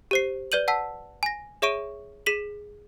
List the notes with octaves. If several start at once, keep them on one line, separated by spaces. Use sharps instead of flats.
G4 C5 C7
B4 D5 G6 D#7 F#7
F#5 A5 E6 B6
G#5 A#6
G#4 C#5 E5 C#6 D7 D#7
G#4 B6 D#7 F#7